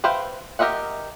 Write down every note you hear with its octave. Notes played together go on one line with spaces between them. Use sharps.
B4 C5 E5 F5 G5
G4 A#4 D#5 E5 F#5